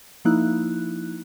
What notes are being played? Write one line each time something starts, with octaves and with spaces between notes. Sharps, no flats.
F3 A#3 D#4 E4 F#6